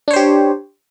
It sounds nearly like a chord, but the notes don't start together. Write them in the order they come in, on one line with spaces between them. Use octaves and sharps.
D4 C#5 C5 G4